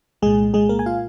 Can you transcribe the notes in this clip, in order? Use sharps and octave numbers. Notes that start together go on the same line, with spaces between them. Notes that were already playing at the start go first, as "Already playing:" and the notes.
C2 A#2 G#3 G#4
C2 A#2 G#3 G#4
A#3 A#4
G#5
A#2 F4 F5